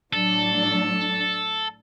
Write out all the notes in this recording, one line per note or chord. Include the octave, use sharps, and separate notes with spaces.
A2 F#3 D4 A4